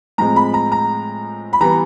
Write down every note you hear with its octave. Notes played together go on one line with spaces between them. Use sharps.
A2 F3 G#3 C4 A#5
B5
A#5
A#5
B5
E3 G3 B3 A#5